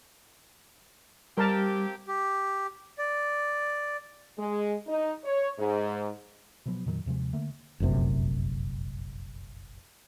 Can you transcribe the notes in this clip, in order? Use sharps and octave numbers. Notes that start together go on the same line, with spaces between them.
G3 A#3 C4 G4 A#4 A5
G4
D5
G#3
D#4
C#5
G#2
B2 F3 F#3 B3
F2 A#2 D#3 F#3
D#2 C3 F3 G#3
D3 A3 A#3
F1 A#1 F#2 C3